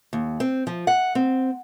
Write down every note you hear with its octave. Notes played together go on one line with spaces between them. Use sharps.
D#2
C4
F3
F#5
C4